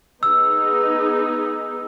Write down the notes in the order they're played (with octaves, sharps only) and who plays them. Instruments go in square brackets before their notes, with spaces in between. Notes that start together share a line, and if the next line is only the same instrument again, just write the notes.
[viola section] B3 D#4 G#4 [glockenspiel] E6